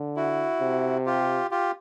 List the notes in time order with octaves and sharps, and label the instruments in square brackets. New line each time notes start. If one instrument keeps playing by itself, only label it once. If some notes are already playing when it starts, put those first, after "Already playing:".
Already playing: [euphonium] D3
[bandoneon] E4 F#4
[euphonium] C3
[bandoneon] F4 G4
F4 G4